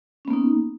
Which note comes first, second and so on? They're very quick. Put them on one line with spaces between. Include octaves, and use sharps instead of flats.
C#4 B3 A#3 D#4